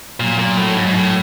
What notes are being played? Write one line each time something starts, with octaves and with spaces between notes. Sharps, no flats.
A#2 F#3
A#2
A2 F#3
G#2
G#2
A2